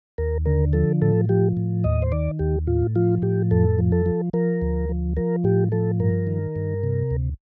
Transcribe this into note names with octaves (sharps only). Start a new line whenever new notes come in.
D#2 A#4
D3 A#4
F3 A4
A2 A4
F3 G4
A2
D#2 D#5
C5
D#3 D5
D#2 G4
A2 F4
F3 F4
A2 G4
F2 A4
F3
A4
F3
F3 A#4
D2
F3
F3 A#4
A2 G4
F3 A4
G2 A#4
D#3
G2
C3
D2